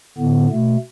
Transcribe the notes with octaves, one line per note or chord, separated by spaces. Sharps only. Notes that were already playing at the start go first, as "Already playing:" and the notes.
A2 D3 B3
B2 A3